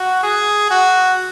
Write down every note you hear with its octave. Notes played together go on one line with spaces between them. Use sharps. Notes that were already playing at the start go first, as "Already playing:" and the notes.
Already playing: F#4
G#4
F#4